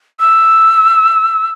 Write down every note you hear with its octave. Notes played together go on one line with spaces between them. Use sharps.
E6